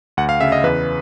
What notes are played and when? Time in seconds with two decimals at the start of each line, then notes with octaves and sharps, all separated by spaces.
0.17 D2 F#5
0.29 F5
0.41 C#3 E5
0.52 D#5
0.63 E2 B4